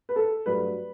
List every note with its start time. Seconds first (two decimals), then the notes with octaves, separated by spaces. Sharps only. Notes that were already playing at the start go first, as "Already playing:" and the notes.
0.09 B4
0.16 A4
0.46 G2 F#3 A3 B4